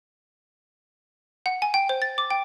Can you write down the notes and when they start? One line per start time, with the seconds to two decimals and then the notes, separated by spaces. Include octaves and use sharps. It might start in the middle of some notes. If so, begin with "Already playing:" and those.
1.46 F#5
1.62 G#5
1.74 G5
1.89 C5
2.02 A6
2.18 D6
2.30 G5